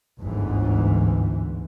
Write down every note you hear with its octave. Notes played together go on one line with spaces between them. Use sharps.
G1 D2 G#2 E3